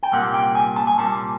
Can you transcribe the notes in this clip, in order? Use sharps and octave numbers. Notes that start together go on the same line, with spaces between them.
G5
C2 A#2 G3 A#3 C#4 F#5
G5
G#5
A5
G#5
C2 A#2 G3 A#3 C#4 A5